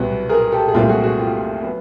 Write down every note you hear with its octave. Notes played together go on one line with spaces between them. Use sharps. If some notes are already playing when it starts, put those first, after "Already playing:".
Already playing: C2 B2 F#3 B3
G#4 A#4
G4 A4
G#4
C2 A#2 F#3 A3 C4 F4 G4
F#4 G#4
F#4 G#4
F4 G4
F#3 B3